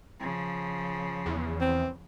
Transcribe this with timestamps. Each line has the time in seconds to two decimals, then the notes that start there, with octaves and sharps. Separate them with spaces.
0.20 C#3 F3
1.26 E2
1.61 C4